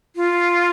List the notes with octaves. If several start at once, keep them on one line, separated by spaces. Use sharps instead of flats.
F4